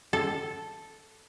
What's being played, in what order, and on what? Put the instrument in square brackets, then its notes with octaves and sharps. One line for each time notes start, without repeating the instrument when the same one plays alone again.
[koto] A4